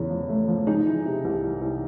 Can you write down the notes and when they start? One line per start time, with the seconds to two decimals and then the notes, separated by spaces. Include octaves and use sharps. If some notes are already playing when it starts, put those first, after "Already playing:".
Already playing: E2 C#3
0.10 F3
0.29 A3
0.48 F3
0.67 G#3 D#4
0.87 E3
1.05 C3
1.24 C2
1.44 E3
1.61 C2